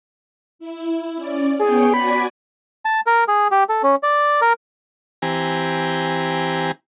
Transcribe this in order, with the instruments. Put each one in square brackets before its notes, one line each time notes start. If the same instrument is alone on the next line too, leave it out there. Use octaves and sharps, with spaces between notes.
[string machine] E4
C#4 D5
[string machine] B3 C#5 G5 [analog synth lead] G#4
[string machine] F#4 D5 G#5 [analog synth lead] B5
[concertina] A5
A#4
G#4
G4
A4
C#4
D5
A#4
[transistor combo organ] E3 C4 G4 G#5 A#5